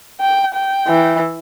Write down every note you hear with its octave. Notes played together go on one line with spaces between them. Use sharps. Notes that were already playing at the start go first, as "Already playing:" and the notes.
G5
G5
E3